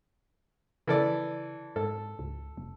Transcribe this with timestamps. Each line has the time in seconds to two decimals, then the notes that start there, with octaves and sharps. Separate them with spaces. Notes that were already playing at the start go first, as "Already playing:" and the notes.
0.87 C#3 E3 A4 D5
1.76 G#2 A4
2.19 C#2
2.57 F1